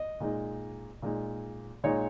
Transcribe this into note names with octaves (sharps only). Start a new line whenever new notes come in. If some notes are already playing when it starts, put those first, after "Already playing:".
Already playing: D#5
A#2 G#3 D#4
A#2 G#3 D#4
A#2 G#3 D#4 C#5